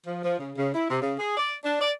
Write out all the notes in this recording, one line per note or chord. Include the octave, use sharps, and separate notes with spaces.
F3
F3
C#3
C#3
E4
C3
C#3
G#4
D5
D4
D5